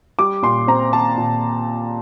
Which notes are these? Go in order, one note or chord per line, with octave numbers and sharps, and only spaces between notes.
G3 D6
A#2 C6
C4 A#5
C4 A5
A#2